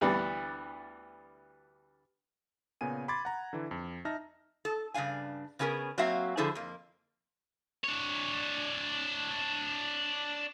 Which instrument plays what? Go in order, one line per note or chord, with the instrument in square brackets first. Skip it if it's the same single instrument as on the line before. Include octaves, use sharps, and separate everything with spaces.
[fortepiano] D2 E3 G3 B3 D4
[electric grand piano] A#2 C#3 B3 G#5 D#7
B5 C6 D6 G#6 A6
F#5 A#5
D3 E3
F2
D#4 E5 A5 F6 A#6
[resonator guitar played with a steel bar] A4
G2 C#3 D4 F5 G#5
C#3 B3 C#4 G#4 A#4
F#3 A#3 C4 F#4 E5 F5
D3 F3 E4 G#4 A4 C5
F2 A#3
[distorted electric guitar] D4 C#5